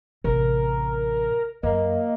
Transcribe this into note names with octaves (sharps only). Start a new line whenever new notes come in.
A1 C3 A#4
F#2 A#3 D#5